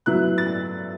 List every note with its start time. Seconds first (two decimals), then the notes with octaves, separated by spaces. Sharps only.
0.06 A2 F#3 B3 E4 F#6
0.38 A6